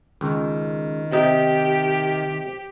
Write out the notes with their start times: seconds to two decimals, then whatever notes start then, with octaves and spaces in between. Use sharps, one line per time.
0.21 C#2 D#3
1.12 C3 D#4 G4